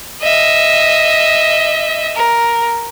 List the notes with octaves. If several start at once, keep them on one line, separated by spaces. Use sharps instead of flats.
D#5 E5
A#4